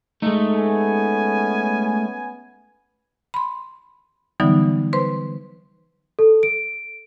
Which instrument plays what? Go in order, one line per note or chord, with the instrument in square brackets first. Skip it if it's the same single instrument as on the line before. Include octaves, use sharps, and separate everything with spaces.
[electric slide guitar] G#3 D#4 [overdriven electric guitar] A3
[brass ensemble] B3 C#4 G#5
[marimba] B5 C6
D3 E3 F#3 G3 B3 D#4
B4 C5 C6
[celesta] A4
D7